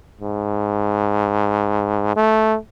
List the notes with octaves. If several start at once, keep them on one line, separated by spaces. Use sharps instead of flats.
G#2
A3